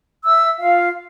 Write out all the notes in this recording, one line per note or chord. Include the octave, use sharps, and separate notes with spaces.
E5 E6
F4 F5